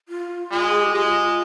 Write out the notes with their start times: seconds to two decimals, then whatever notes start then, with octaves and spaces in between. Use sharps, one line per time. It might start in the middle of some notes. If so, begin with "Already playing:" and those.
0.09 F4
0.51 G#3
0.69 G#4
0.82 G4
0.94 G#3 F4